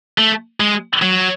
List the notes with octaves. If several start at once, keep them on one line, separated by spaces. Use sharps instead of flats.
A3
G#3
F#3